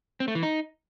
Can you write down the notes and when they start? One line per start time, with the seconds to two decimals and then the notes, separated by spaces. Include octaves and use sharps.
0.20 C4
0.28 A3
0.35 E3
0.43 D#4